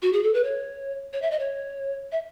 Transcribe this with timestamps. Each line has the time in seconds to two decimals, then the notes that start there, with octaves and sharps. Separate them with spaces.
0.02 F#4
0.13 G#4
0.23 A4
0.34 B4
0.44 C#5
1.13 C#5
1.22 E5
1.31 D#5
1.39 C#5
2.12 E5